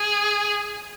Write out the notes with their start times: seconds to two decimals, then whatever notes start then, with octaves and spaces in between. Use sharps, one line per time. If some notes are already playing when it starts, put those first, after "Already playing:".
Already playing: G#4